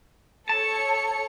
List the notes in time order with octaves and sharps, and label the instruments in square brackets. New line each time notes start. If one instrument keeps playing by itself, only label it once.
[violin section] A4 C#5 C#7 [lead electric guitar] A5